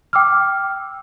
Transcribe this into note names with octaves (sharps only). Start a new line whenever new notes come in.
G5 D6 E6 F6